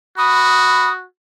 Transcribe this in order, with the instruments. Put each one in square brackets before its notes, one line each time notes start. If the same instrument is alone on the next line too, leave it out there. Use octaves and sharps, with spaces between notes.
[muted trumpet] F#4 [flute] B5 [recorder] D#6